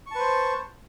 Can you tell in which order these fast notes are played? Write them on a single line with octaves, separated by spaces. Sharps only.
C#6 A5 B4 C5